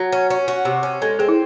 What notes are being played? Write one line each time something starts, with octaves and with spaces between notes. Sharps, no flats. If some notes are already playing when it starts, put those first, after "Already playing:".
Already playing: F#3
C#4
C#4
F#4
C3
C#4
G#3 A4
C4 G#4
E4